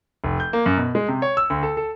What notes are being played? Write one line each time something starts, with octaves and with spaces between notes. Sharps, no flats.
F1
G6
A#3
F#2
B2
G#3
C3
C#5
E6
D2
A4
A4